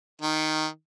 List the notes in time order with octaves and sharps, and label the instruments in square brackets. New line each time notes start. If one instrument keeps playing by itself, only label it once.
[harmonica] D#3